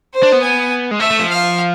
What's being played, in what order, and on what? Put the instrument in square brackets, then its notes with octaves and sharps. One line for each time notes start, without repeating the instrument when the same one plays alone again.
[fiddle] C5
[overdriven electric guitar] D4
B3
[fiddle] G#5
[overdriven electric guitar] G#3
[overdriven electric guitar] A3 [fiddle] E5
[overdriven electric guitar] A3
F3
[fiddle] F5